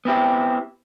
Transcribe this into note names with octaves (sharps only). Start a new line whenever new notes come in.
B3 C4 E4 G4